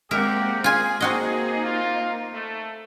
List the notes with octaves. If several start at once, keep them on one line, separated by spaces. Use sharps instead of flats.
G#3 A#3 C4 G4 A#4 E5 F#5
F4 G#4 G#5
A#3 C4 D#4 F#4 D#5
F4
A3